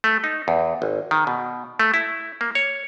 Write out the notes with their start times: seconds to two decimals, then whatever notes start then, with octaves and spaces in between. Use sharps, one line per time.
0.04 A3
0.24 D#4
0.48 E2
0.82 G#1
1.11 D#3
1.27 B2
1.79 A3
1.94 E4
2.41 A#3
2.55 C#5